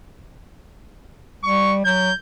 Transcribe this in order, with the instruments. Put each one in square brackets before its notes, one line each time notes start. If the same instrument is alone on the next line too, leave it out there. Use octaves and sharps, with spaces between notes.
[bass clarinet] G3 [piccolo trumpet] C#6
[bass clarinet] F#3 [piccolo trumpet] G6